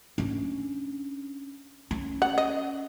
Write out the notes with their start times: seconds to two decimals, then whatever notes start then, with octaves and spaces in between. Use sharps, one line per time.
0.18 C#4 D4
1.91 C#4
2.22 F#5
2.38 D#5